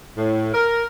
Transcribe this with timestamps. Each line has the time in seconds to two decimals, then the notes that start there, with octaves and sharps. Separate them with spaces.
0.17 A2
0.54 A#4